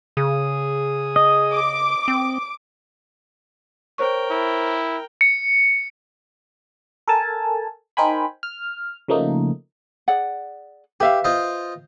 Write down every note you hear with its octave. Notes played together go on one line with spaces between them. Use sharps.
C#3 G#4 D#6
D#5
D6
C4
A#4 C5 C#5 G5 C#6
E4
C#7
A4 A#4 G#5 A5
D#4 A#4 C5 G5 G#5 B5
F6
C#3 F3 A3 A#3 D#4
G#4 D5 F#5
G4 B4 E5 F5
F4 C5 D#5